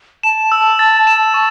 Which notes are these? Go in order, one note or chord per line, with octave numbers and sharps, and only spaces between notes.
A5 E7
E6
A6
E7
C#6